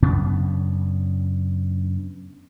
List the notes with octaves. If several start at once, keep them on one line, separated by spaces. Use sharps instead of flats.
F#2 C#3 B3 D4